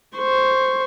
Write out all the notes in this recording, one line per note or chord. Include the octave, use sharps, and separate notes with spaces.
C5 C#6